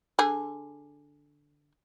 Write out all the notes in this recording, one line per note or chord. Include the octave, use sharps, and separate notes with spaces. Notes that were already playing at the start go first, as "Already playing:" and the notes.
D3 G#4